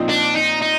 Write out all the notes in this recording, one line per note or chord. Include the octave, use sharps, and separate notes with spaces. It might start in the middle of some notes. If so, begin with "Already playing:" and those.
Already playing: A#2 F3 C4 D#4
D4
D#4
D#4